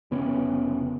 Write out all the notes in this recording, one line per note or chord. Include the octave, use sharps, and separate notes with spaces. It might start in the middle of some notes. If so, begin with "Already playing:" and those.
F1 C#3 B3 C#4